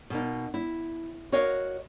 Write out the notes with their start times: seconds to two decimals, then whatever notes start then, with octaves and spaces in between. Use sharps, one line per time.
0.10 B2 A#3 D#4
0.54 E4
1.32 F#4 A#4 C#5 D#5 F5